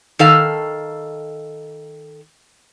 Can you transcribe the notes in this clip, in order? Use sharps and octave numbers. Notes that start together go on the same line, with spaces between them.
D#3 A4 F5